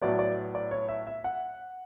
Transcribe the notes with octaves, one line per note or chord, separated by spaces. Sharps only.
A2 F#3 B3 D5
D5
D5
C#5
E5
E5
F#5